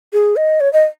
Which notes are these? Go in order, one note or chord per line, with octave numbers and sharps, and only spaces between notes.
G#4
D#5
C#5
D#5